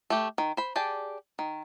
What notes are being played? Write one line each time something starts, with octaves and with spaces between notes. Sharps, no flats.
A3 G4
D#3
C5 B5
G4 G#4 D5 A5
D#3